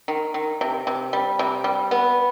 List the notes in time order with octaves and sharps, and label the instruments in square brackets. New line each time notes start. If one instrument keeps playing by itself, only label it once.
[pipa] D#3
D#3
C3
C3
G3
C3
G3
B3